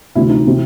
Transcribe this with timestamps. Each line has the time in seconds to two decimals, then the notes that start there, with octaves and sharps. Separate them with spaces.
0.15 D2 C3 E3 E4
0.30 D#4
0.47 C3 E3